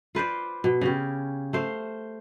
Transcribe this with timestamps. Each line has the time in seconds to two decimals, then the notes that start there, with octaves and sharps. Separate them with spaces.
0.15 F4 B4 C5 D5
0.64 B2
0.81 C#3 C#4 G4
1.53 A3 C5 F5